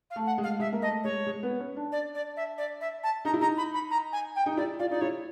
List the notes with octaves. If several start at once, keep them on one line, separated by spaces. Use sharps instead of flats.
F5
A3
F#5
G#3
F5
G#3 E5
A#3
A3 D#5
G#3 C#5
G#3
B3
C#4
D4
D5
D5
E5
D5
E5
A5
D#4 A#5
E4
D#4 A#5
B5
B5
A#5
G#5
G5
D#4
E4 D5
F4 D5
D#4 D5
E4 C#5